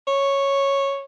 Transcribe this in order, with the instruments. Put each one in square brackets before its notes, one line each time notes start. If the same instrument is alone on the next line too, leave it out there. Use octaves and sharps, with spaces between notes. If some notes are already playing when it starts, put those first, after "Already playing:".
[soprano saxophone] C#5